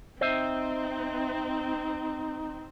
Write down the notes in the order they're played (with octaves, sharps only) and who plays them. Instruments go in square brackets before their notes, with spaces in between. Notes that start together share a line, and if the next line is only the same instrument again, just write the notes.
[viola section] C4 [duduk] D#4 [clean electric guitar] C5 D#5 E5